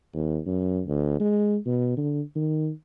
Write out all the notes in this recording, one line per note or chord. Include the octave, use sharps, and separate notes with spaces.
D#2
F#2
D2
G#3
B2
D3
D#3